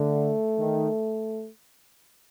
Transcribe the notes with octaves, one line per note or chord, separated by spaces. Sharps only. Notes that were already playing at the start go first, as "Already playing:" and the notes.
Already playing: D3 A3
D#3